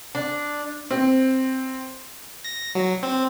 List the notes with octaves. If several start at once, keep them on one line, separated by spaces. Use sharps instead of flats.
D4
C4
A#6
F#3
C4